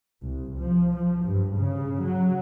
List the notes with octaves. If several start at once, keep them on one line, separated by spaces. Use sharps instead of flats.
C2
F3
F3
G2
C#3
F#3